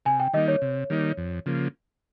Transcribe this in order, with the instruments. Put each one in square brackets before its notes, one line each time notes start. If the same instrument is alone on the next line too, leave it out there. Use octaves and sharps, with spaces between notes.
[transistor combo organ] C3 [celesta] G#5
[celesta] G5
[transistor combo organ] D#3 G3 A#3 D#4 [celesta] D#5
[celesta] C#5
[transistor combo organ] C3
D#3 G3 A#3 D#4
F2
C#3 F3 A#3